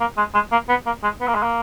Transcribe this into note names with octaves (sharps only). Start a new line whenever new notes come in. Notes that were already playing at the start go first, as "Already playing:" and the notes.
A#3
G#3
G#3
A#3
B3
A#3
G#3
B3
A#3
G#3
A#3